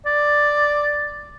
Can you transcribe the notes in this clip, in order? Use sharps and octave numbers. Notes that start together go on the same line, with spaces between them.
D5